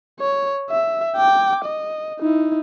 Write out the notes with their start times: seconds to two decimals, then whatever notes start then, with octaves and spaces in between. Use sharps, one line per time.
0.20 C#5
0.70 E5
1.17 G5 D6
1.65 D#5
2.20 D#4 E4